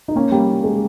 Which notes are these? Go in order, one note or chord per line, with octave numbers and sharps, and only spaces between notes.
D#4
A#3 C#4
G3 A#3
G#3